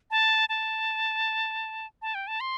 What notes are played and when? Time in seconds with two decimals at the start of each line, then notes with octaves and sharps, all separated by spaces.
0.11 A5
0.49 A5
2.02 A5
2.15 G5
2.27 A5
2.40 C6